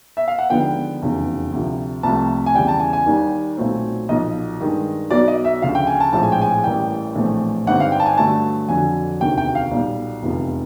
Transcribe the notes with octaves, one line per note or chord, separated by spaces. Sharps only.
E5
F5
F#5
D#2 D3 F3 G#3 B3 G5
F1 E2 C#3 F#3
D2 C3 F3
C2 C3 F3 A3 A5
G#5
E2 C#3 E3 G3 G5
A5
G#5
G#5
D#2 D#3 G3
B1 A#2 F#3 A3 C4
B1 A#2 F3 D#5
G2 D#3 G#3
B1 B2 F#3 B3 D5
D#5
E5
D2 C#3 F3 F5
G5
G#5
A5
A#1 A2 F3 G#3 C4 A5
G#5
G5
G#5
A1 A2 E3 G3 A#3 G5
A#1 A2 E3 A3 C4
G#1 G2 D3 G3 C4 F#5
F5
G5
A5
G#5
G2 D3 F#3 A3 A5
F2 D3 F#3 G#5
E1 D2 C3 D#3 F#3 G5
G5
F5
B1 A#2 G3
F1 E2 C3 F3